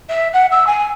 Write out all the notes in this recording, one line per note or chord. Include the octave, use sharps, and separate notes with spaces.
E5
F#5
E6
G#5